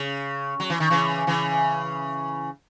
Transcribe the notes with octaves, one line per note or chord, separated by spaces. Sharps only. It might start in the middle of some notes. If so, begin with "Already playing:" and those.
Already playing: C#3
F#3
E3
D#3
C#3 E3
C#3 E3